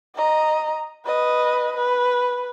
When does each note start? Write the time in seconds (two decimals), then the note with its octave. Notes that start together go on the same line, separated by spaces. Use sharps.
0.15 D#5 A#5
1.05 B4 D#5
1.77 B4